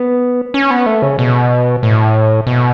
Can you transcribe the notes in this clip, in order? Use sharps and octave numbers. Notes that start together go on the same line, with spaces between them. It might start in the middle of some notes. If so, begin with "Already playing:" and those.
Already playing: B3
C#4
B3
A3
C#3
B2
A2
B2